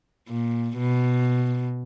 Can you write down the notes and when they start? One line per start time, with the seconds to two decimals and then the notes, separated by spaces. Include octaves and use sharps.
0.29 A#2
0.77 B2